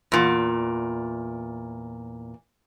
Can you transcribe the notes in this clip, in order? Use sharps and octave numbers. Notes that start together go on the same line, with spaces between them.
E2 A#2